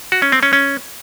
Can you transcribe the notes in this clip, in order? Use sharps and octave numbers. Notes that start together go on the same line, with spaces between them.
F#4
C#4
C4
C#4
C#4